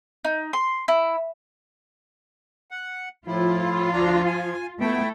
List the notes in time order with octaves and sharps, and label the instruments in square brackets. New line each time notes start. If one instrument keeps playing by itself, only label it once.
[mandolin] D#4
C6
E4
[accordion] F#5
[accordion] A2 E4 [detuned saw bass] F3 [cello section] F4
[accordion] D2 D4 A#5
G#5
[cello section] A3 [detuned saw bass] B3 [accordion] E4 E5 G5